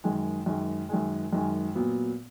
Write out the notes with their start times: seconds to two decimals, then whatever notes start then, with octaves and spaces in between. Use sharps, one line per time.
0.04 F#2 D#3 G#3
0.46 F#2 D#3 G#3
0.89 F#2 D#3 G#3
1.33 F#2 D#3 G#3
1.75 A#2 F#3 B3